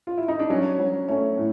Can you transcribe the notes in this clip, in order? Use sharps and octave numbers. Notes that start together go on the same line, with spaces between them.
F4
E4
D#4
D4
F#3 C#4
F#3
A3 C#4
A2